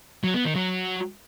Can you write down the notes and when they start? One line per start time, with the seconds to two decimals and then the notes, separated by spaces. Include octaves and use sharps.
0.24 F#3
0.34 B3
0.45 D#3
0.55 F#3